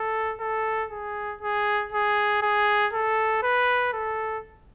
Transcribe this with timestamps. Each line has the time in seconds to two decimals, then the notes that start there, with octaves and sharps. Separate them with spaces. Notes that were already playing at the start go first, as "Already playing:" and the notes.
Already playing: A4
0.40 A4
0.90 G#4
1.41 G#4
1.92 G#4
2.42 G#4
2.93 A4
3.43 B4
3.93 A4